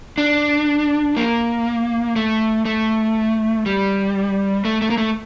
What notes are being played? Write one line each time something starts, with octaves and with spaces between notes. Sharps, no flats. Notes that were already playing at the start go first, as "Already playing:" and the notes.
D4
A#3
A3
A3
G3
A3
A3
A#3
A3